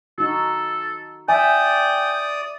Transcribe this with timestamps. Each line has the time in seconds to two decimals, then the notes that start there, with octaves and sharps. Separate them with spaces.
0.18 D#4 F#4 A4
1.29 D5 E5 G5 G#5 D#6